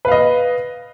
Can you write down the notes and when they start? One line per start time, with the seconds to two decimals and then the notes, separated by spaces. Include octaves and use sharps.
0.05 B4
0.08 F5
0.12 D#5